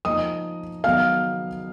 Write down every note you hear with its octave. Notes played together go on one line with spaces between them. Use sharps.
F3 A#3 D#4 D#5 D#6
D#3 F#3 B3 D#4 F5 F6